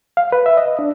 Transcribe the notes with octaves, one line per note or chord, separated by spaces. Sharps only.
F5
B4
E5
D#5
D4